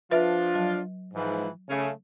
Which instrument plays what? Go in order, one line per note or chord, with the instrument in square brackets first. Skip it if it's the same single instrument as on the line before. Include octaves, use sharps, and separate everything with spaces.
[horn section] F3 D4 F4 [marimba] B4 E5
[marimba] F#3
[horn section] G#2 E3 F3
C#3 A3 C#4